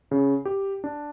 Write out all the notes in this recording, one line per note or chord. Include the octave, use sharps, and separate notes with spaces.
C#3
G4
D4